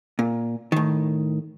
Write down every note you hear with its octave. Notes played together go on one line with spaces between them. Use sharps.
A#2
A2 D#3